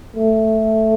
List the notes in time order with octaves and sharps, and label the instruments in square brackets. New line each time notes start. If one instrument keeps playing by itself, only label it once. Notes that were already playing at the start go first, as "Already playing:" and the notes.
[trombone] A3